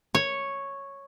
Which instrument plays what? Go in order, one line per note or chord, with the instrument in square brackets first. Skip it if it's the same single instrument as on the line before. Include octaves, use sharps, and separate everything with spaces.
[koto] C#5